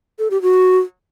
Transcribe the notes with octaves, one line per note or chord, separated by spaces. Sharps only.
A4
G4
F#4